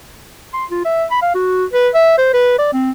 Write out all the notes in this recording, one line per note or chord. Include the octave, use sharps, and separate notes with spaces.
C6
F4
E5
B5
F5
F#4
B4
E5
C5
B4
D5
C4